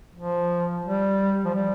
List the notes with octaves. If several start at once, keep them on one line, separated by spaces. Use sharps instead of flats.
F3
G3
F3
G3